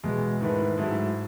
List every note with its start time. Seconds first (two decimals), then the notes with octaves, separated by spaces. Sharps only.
0.04 E2 B2 G#3
0.41 G#2 D#3 A3 E4 B4
0.78 G#2 F#3 A3 E4